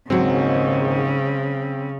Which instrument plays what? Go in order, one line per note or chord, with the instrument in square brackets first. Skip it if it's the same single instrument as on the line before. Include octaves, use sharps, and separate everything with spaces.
[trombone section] A#1 D#2 G#2 [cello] C#3 [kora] F#3 G#3 [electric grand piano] C4